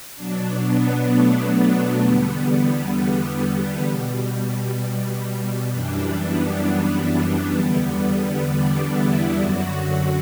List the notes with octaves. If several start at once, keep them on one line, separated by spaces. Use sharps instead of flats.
B2 F#3 D4
B3
A3
A3
E2 D3 G3 B3
B2 G3
F#2 E3 G3 D4
B3
B3
E2 D3 G3
D4
E4
F#2 D3 F#3 F#4
F#4